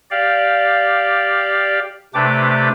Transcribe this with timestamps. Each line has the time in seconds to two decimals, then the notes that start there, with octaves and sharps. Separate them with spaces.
0.11 G4 D5 F5
2.14 C3 A3 D4 G4 B4 D6